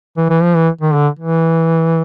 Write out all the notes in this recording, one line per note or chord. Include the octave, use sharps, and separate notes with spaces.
E3
E3
F3
E3
D#3
D3
E3